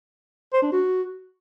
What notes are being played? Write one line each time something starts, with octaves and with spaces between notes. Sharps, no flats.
C5
D4
F#4